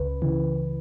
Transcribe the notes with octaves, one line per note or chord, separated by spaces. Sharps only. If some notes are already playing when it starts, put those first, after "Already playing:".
Already playing: C#2 C#3 B4
C#3 E3